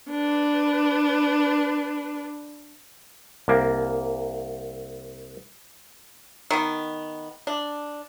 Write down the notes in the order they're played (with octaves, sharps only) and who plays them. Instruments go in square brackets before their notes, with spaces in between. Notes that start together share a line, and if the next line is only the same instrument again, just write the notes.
[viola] D4 B4
[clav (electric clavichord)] C2 A#3
[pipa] D#3 B3
D4